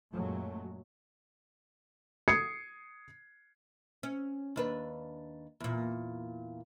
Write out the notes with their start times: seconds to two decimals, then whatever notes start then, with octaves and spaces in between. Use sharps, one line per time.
0.12 F#2 A#2 F#3 G#3 A3
2.28 D#6 G#6 C7 C#7
4.03 C#4
4.56 D#2 D4 B4
5.60 E2 A#2